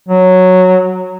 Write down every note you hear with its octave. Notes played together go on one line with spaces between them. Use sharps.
F#3